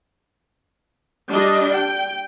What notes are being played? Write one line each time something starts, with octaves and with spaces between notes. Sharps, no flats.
G3 D4 D#5
G5